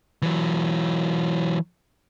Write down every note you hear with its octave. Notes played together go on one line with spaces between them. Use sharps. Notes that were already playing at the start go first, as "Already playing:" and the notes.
E3 F#3